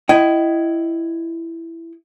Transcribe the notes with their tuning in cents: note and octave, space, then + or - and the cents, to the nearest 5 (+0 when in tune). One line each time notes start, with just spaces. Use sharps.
E4 +10 D#5 +0 G5 -30